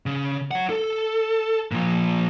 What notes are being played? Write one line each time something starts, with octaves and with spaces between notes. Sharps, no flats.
C#3
C#5 F#5
A4
A#2 F3